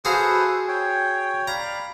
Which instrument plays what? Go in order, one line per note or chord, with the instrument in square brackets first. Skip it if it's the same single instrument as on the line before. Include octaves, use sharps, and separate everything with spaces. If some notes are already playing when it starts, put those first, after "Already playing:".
[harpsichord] F#4 G#4 F5 [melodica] A4 B4 C5
[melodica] C#5 G5
[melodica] D5 F5 B5 [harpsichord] A#5